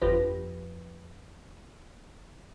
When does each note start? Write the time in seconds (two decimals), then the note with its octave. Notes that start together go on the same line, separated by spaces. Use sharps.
0.01 G1 F2 F3 G4 B4 A#6